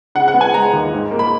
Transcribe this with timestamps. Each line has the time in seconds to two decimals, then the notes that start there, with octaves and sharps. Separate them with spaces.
0.15 C#3 F#5
0.28 F#5
0.34 B3
0.41 G#5
0.54 G#3 A#5
0.73 D#2
0.92 G#2
1.11 A#3
1.19 B5